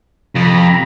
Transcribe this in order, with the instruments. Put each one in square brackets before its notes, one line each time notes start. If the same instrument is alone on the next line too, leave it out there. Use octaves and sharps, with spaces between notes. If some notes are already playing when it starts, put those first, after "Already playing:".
[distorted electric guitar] F2 [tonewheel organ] C3 A#5 B5